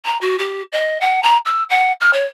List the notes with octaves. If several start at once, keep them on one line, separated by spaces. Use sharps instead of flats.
A#5
F#4
G4
D#5
F#5
A#5
E6
F#5
F6
C#5